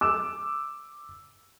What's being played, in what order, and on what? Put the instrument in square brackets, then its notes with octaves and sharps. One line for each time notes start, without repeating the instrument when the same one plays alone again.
[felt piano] D6 E6 E7